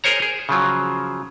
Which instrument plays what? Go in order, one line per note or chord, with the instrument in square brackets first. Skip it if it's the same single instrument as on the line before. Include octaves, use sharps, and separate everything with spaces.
[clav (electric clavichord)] G#4 A#4 C5 C#5 A#5
G#4
C#3 F3 F#3